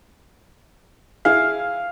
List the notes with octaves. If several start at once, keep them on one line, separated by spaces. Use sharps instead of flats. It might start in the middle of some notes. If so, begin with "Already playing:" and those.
E4 G#4 F5